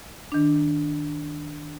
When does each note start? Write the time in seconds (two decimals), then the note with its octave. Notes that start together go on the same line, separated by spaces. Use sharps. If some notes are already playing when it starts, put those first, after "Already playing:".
0.32 D#3 D4